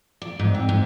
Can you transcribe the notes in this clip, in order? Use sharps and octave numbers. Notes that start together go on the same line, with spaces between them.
D5
G#2
C4
G#2